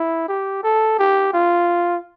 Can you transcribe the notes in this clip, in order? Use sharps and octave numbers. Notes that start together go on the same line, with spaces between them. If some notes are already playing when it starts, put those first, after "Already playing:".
Already playing: E4
G4
A4
G4
F4